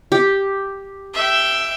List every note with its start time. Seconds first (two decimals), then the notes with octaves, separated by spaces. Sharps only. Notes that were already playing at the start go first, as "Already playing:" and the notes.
0.12 G4
1.14 E5 G5